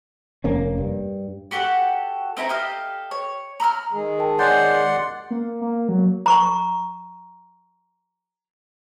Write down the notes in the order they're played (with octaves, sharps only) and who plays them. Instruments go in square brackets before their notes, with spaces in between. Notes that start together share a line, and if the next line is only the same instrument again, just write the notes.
[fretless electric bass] F1 A#3 C#4
G2
[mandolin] F#4 G4 A4 F#5
C4 D#4 E4 A#5
G4 A4 D#5 F5
C#5
A#5 B5 E6 F6
[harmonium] D#3 G#3 G#4
[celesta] A#4 G5 A5
[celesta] C#5 G#5 G6 [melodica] D5 F#5 C6
[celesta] C#7
[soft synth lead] A#3
A#3
F#3
[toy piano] A#5 C#6